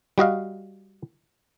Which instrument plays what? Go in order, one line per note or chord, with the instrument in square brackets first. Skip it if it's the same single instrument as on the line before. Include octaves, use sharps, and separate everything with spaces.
[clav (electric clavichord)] G3 F#4 D#5 F5